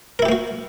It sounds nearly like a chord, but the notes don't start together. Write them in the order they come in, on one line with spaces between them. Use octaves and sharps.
A#4 E4 G4 A#3 F#4